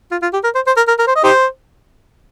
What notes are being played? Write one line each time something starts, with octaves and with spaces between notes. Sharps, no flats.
F4
F4
G4
A#4
C5
C5
A#4
A#4
A#4
C5
D#5
D#4 G4 C5